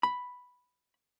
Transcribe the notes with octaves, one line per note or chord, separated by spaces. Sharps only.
B5